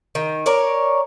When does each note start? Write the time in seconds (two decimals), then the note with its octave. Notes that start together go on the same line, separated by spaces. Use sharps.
0.15 D#3
0.46 A#4 C#5 D5